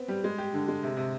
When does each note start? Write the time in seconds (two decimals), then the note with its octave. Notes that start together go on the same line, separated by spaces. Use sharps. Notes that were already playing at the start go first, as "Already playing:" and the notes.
Already playing: B3 C4
0.08 G3
0.24 G#3
0.38 G4
0.54 D3
0.68 G#3
0.83 C3
0.97 C3